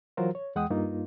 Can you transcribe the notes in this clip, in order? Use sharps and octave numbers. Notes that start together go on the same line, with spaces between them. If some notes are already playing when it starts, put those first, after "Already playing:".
E3 F#3 F4 F#4 A#4 C5
C#5
E2 G#3 F#5 G5 D#6
G2 A#3 D#4 F4